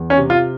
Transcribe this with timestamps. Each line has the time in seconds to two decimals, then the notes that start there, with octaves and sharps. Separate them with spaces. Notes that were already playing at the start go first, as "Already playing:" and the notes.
Already playing: E2
0.10 C#4
0.17 C3
0.30 F4